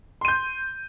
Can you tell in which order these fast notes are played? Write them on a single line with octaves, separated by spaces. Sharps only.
C6 D#7 G6